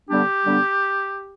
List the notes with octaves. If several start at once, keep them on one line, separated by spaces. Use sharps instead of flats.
D3 G3 B3 D4 G4
D3 G3 B3 D4